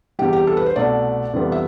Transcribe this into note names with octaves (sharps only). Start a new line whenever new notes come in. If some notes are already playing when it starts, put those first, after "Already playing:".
E2 C3 E3 G3 G4
G4
A4
B4
C5
C2 B2 A3 D5
F2 C3 E3 G3 B3
E5